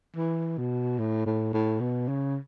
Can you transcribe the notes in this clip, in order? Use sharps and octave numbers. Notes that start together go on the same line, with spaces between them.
E3
B2
A2
A2
A2
B2
C#3